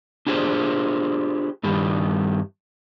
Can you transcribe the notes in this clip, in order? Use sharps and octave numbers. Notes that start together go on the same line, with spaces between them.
D4 F4 G4 G#4 C5
G2 D#3 G3